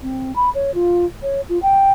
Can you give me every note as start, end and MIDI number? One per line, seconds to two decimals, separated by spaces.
0.02 0.34 60
0.35 0.49 83
0.54 0.74 73
0.74 1.05 65
1.22 1.41 73
1.49 1.61 65
1.62 1.92 79